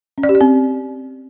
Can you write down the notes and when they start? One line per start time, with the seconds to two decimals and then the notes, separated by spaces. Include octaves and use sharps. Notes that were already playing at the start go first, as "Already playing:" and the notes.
0.18 C#4
0.23 D5
0.29 G4
0.35 D5
0.41 C4